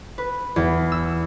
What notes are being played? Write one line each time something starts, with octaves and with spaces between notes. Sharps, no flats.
B4
E2
E6